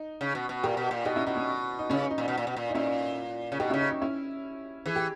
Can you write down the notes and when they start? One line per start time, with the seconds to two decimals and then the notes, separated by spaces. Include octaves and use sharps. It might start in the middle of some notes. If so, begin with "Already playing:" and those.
Already playing: D#4
0.21 C#3
0.35 B2
0.49 B2
0.63 A#2 G4 A#4
0.77 B2
0.91 A#2
1.05 B2 D#4 G4
1.16 C#4 E4
1.26 B2 D#4
1.37 C#4
1.79 D#4
1.90 C#3 C#4
2.11 D#4
2.18 A#2
2.28 B2
2.38 A#2
2.47 B2
2.57 A#2
2.70 D#4
2.75 A#2 C#4 E4
3.52 C#3
3.60 B2 D#4 G4
3.70 C#4 E4
3.74 C#3
3.81 D#4
3.91 D#4
4.02 C#4 E4
4.86 E3 G#4
4.96 G4